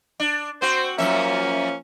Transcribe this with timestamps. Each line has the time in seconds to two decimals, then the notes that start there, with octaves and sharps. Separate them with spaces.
0.20 D4
0.62 C4 F#4 C5
0.98 F#2 F3 G#3 A#3 C#4 E5